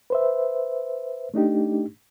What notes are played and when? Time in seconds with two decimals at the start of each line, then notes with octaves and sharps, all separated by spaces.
0.10 B4 C5 E5
1.34 A3 D4 D#4 G4